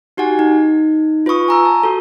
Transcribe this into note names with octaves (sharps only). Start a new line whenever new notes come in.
D#4 F#4 G4 F#5 G#5
D#4
F4 B4 B5 C#6 D#6
G#5 A#5 E6
A5
F#4 A4